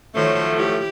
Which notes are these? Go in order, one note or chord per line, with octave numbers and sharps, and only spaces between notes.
D#3 F3 F#3 A3 C5 C#5
E4 G4